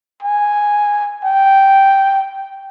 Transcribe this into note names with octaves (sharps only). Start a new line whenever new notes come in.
G#5
G5